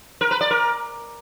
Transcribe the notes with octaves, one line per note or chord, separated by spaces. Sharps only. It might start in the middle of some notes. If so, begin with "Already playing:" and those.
A#4
B4
D5
A#4